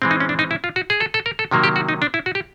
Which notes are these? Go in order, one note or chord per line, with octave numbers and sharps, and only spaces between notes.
E3 G#3 C4
D#4
C#4
D4
D#4
E4
F4
F#4
G#4
A4
A4
A#4
A4
C3 D#3 F#3 A#3
G4
F#4
D#4
D4
E4
F#4
G4